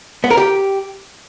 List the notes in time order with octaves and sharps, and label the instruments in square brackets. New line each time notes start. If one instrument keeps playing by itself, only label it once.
[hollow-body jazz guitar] B3
A#4
G4